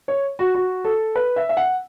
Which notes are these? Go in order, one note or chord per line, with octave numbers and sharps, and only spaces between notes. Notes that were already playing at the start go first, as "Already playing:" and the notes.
C#5
F#4
F#4
A4
B4
E5
E5
F#5